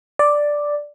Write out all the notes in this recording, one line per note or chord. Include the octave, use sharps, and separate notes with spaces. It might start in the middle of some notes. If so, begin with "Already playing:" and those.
D5